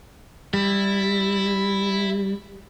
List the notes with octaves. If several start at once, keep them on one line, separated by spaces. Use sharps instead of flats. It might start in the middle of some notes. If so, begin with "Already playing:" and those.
G3 E4